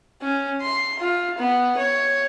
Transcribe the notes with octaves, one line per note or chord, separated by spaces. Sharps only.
C#4
C6
F4
B3
C#5